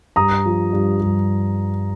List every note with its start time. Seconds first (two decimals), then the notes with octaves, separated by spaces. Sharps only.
0.16 G2 A#5 D#6
0.46 F3
0.73 G2
1.01 G2